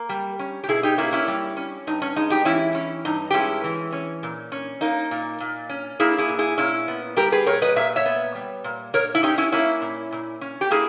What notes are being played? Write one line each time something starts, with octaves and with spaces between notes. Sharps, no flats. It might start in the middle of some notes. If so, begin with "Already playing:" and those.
Already playing: A#3 A#4
G3
C#4
G4
B2 E4 G#4
D#4 G4
A#3 C#4 E4
C#4 E4
G3
C#4
G2 D#4
C#4
G#3 D#4
D#4 G4
E3 C#4 E4
C#4
G2 D#4
G4
G#3 C#4 E4
E3
C#4
A#2
C#4
A#3 D#4
A#2
A#2
C#4
A#3 E4 G#4
E4 G#4
A#2
E4 G#4
A#2 C#4 E4
B3
G3 G4 A#4
G#4 B4
A#2 A#4 C#5
B4 D#5
A#2 E5
C#5 E5
B3
G3
A#2
A#2 A#4 C#5
E4
C#4 D#4 G4
C#4 E4
A#3 C#4 E4
A#2
A#2
C#4
G4
A#3 E4 G#4